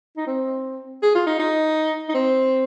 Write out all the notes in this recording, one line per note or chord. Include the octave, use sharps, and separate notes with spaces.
D#4
C4
G#4
F4
D#4
D#4
D#4
C4